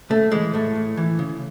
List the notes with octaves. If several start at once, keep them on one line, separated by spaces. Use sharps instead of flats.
C#3 A3
E3 G#3
A2 A3
A2
E3
C#3